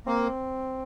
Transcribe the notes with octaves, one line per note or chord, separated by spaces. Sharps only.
A#3 C4